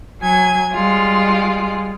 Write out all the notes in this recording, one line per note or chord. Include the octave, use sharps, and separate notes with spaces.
F#3 G#5 G#6
G3 G#3 F4